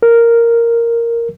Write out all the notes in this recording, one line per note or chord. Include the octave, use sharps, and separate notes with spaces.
A#4